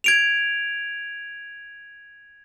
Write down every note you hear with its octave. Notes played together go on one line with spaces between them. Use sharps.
G#6 D7 F7